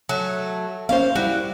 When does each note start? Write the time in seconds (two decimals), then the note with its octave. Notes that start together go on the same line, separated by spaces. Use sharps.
0.09 F#3 A3
0.89 A#3 C#4 C5 F5
1.16 G3 E4 F#4